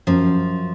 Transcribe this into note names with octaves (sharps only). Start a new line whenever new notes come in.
F#2 F3